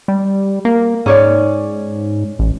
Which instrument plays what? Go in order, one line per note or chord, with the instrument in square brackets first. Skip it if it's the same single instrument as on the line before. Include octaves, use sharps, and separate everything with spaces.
[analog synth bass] G3
A#3
[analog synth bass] G#2 [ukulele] C#4 C#5 D5
[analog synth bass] A1